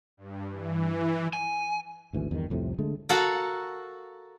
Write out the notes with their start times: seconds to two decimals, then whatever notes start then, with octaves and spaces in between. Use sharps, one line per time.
0.17 G2
0.50 E3
1.33 G#5
2.13 G#1 D2 E3
2.31 E2 G2 B2 D#3
2.50 C2 F2 A2 C3
2.79 D3 G#3 A3
3.09 F#4 A4 A#4 F5 F#5